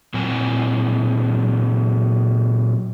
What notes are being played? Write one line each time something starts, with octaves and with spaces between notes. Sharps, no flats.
A#2 F#3 C4 G#5